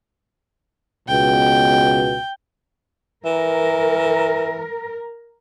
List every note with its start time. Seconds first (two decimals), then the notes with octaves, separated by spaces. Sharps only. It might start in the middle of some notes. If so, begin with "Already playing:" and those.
1.08 C#2 B2 G5
3.25 E3 A#4